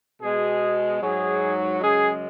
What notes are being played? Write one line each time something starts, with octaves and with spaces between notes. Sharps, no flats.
B2 G#3 G#4
G#2 F#3 G#4
F#2 C#3 G#3 G#4